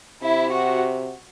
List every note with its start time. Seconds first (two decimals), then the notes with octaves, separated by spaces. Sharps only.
0.22 C3 E4
0.52 F#4